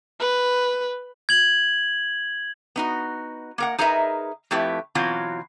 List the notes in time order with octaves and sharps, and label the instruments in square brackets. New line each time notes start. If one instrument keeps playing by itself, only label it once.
[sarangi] B4
[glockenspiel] G#6 F#7
[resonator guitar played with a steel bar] B3 D#4 F#4
A#3 A#4 F#5
D#4 G#4 A#4 B4 D#5 E5
F2 A3 E4 G4 B4
B2 E3 F#3 C4 F4 F#4